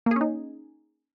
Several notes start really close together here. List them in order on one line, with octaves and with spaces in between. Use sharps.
A#3 G#4 C#4 D#4